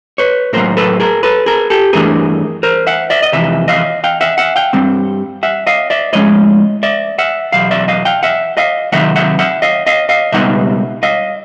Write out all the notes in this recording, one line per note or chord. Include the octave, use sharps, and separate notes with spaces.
B4 C#5
A2 F#3 A#3 A#4 C5
A4 B4
G#4 A#4
A4 B4
G#4 A#4
G4 A4
G2 E3 A3 D4 G#4 A#4
A#4 C5
E5 F#5
D5 E5
D#5
F2 C3 E3 E5
D#5 F5
F5 G5
E5 F#5
E5 F#5
F5 G5
G2 D#3 G3 C4
E5 F#5
D#5 F5
D5 E5
A2 F3 G#3 C#4 C#5 D#5
D5 E5
E5 F#5
E2 B2 F#3 F5
D5 E5
D#5 F5
F5 G5
E5 F#5
D#5 F5
C3 D#3 F#3 E5 F#5
E5 F#5
E5 F#5
D#5 F5
D#5 F5
D#5 F5
C#2 B2 G3 B3 D#4 E5 F#5
D#5 F5